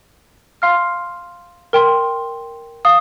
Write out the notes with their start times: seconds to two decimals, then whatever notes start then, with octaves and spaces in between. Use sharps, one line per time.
0.62 F5 C6 F6
1.73 A#4 G5 C6
2.85 F5 D#6